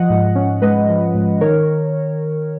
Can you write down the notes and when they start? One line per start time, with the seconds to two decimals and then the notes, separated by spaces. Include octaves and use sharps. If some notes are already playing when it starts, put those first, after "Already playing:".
Already playing: F3 D#5 F#5
0.10 G#2
0.35 C#4
0.62 G#3 B4 D#5
0.89 F3
1.14 G#2
1.41 D#3 A#4 C#5